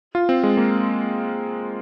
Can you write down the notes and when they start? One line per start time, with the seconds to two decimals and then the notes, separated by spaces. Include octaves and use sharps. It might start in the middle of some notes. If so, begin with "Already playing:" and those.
0.15 F4
0.29 C4
0.43 G#3
0.57 A#3